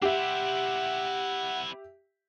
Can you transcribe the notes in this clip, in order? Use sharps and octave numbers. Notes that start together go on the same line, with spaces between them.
C4 E4 G4 E5 F#5